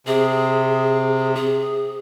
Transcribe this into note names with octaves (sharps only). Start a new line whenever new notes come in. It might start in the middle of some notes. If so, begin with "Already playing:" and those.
C3 G#4
G#4